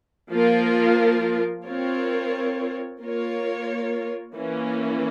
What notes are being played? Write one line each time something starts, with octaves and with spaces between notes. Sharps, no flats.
F3 A#3 F4 A#4
C4 F4 A#4 C#5
A#3 F4 A#4 C#5
E3 A#3 C#4